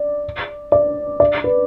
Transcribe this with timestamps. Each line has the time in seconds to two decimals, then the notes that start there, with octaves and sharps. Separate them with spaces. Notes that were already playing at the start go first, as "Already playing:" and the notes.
Already playing: D5
0.72 D5
1.20 D5
1.44 B4